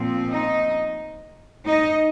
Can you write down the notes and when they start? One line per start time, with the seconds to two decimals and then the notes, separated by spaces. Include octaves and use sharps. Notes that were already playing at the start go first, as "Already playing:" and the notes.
Already playing: A#2 F3 C4
0.31 D#4 D#5
1.66 D#4 D#5